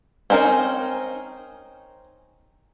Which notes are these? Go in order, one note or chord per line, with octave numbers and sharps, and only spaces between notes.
C4 C#4 D#4 A#4 C5